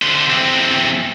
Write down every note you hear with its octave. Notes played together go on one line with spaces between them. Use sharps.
D3 C5
E2 C4